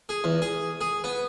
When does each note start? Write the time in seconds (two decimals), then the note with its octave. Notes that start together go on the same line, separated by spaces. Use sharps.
0.09 G#4
0.24 E2
0.42 G#4
0.81 G#4
1.04 B3